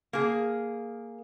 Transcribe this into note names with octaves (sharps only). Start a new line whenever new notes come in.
A#3 G#4